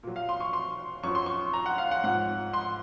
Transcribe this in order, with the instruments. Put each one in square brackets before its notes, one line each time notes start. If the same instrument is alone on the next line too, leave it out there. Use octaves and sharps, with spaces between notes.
[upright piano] A#2 F#3
F5
C6
C#6
C6
F#2 F3 C#6
C6
C#6
A#5
F#5
F5
F#5
G#2 F3 F#5
C6